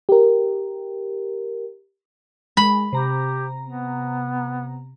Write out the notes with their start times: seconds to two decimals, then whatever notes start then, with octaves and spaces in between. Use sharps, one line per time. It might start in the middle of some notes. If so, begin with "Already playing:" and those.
0.09 G4 A#4
2.57 G#3 B5
2.93 C3 G4 A#5
3.66 B3